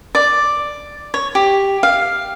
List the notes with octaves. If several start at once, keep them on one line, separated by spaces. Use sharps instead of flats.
D5
C#5
G4
F5